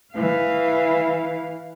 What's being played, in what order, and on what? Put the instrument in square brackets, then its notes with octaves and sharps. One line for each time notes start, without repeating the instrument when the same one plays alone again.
[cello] E3 F5